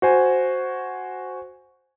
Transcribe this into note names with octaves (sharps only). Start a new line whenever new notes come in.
F#4 C5 G#5